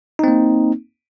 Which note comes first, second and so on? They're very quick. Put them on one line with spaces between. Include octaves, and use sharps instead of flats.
D#4 C4 A#3